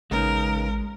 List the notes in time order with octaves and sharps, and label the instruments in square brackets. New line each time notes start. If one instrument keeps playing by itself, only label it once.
[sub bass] A1 [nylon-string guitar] C#3 B3 D#4 [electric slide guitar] G#3 [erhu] A#4